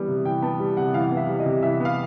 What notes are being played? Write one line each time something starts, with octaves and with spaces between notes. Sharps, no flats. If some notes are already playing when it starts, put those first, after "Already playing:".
Already playing: E3 G3 B3
C3
E3 G5
B3 A5
G3
C3 F#5
E3 F5
F5
B3
E5
G3
D#5
C3
E3 E5
B3 F5